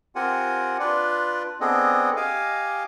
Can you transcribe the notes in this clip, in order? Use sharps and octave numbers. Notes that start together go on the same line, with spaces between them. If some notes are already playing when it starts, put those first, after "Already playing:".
C4 F4 G4 A#4 F#5 G#5
D4 F4 B4 D5
B3 C4 D4 G#4 A4 D#5
G4 D#5 F5 G#5 D6